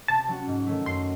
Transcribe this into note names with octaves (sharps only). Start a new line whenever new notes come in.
C3 A5
F#3 C#4 F#4
G#2
D#3 F#3 A3
F#2 C6